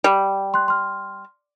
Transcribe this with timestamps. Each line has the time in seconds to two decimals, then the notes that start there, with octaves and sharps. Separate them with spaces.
0.04 G3
0.54 C6 F#6
0.68 C6 F6